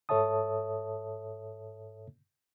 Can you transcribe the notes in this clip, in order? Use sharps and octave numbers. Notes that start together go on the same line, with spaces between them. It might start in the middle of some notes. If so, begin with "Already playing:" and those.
G#2 A4 C#5 E5 A5 D#6